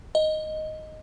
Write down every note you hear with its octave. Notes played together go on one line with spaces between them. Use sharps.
D#5